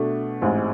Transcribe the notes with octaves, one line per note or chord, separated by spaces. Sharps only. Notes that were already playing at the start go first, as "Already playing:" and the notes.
Already playing: B2 A3 D4
A1 G#2 G#3 C4